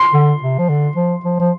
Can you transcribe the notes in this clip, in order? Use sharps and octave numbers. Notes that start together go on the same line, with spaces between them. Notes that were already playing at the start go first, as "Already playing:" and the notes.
Already playing: C6
D3
C3
F3
D3
F3
F3
F3